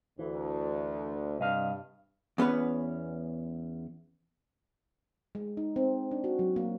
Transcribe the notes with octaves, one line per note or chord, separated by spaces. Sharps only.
D2 E3
C2 G2 D#5 F5
E2 B3 C#4 B4
G#3
D#4
C4
D4
F#4
F#3
A#3